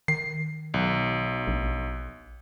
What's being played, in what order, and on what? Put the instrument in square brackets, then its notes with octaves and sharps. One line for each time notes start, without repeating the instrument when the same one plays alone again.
[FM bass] D#3 [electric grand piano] C7
[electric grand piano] B1
[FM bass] A#1